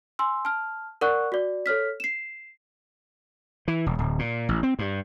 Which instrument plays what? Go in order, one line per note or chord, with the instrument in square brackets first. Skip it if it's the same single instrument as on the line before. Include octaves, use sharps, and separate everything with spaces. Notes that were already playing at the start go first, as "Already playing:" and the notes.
[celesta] G#5 C6 E6
A5 F6
A#4 D5 F#5 C#6 F#6
F#4 D5
A4 C#5 F6 B6
C7 E7
[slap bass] E3
E1
D1
A#2
A1
C4
G2